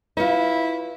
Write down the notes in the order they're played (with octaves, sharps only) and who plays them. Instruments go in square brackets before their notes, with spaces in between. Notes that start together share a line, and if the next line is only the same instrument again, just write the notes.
[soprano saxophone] E4 [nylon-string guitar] F4 B4 C#5